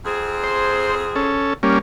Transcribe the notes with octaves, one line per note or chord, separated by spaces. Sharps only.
F2 C4 G#4
C5
C#4 A4
G3 A#3 C#4